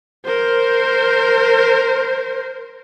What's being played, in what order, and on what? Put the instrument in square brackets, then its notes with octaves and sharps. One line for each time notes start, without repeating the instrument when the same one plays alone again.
[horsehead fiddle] A#4 C5